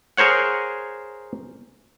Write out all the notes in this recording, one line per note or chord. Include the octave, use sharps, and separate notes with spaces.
G#4 A#4 C5 C#5 F#5